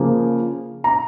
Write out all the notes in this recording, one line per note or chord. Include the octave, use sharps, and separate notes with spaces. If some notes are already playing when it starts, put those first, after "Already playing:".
Already playing: C#3 F3 A#3
A#5